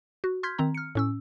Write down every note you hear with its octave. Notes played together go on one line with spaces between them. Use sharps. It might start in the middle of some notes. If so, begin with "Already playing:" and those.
F#4
C6 F6 G6 G#6 B6
D#3 C4 A#5
F6 C#7
A2 C#4 E6